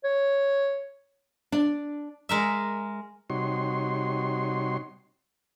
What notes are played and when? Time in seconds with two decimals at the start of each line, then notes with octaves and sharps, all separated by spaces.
0.04 C#5
1.52 D4
2.29 G#3 A#4 E5
3.30 C3 G3 D#4 F#4 C#5 C6